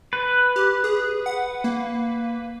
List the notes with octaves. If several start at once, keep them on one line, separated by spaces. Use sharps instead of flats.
B4
G4
G#4
F#5
A#3